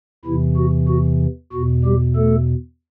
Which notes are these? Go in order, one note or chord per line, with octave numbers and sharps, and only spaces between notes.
E2 C3 E3 E4
F#4
F#4
E2 B2 F#4
G3 G4
A3 A4